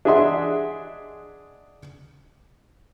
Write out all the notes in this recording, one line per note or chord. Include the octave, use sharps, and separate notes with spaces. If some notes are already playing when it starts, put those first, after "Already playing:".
D4 G#4 D#5 E5 F#5 C6